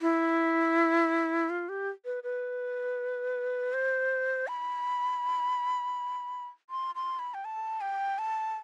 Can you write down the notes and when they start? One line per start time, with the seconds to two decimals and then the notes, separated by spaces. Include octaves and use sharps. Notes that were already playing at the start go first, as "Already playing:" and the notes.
0.01 E4
1.49 F4
1.69 G4
2.05 B4
2.23 B4
3.73 C5
4.48 B5
6.70 C6
6.95 C6
7.19 B5
7.34 G5
7.45 A5
7.81 G5
8.19 A5